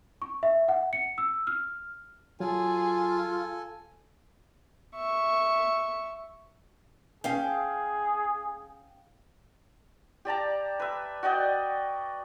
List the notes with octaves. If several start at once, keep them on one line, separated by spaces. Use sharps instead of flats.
C#6
E5
F#5
C#7
E6
F6
F#3 F4 G#4 A4 G#5
E5 C#6
C#4 G#4 F5 G5
G4 D5 A5 A#5
B4 E5
F#4 D5 D#5 G5